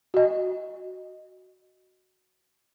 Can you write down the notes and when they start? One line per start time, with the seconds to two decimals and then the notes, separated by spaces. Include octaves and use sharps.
0.14 F#4 D#5